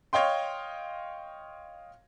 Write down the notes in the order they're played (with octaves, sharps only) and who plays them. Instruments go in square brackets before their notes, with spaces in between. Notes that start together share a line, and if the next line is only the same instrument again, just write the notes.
[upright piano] C#5 D#5 F5 G5 C6